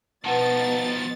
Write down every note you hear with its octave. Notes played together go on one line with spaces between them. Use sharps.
B2 D#3 F3 B4 F#5 A5 A6